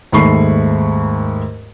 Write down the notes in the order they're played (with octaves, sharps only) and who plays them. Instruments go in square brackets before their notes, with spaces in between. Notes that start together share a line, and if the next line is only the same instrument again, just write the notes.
[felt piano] D#2 G#2 A3 B5 C#6 C7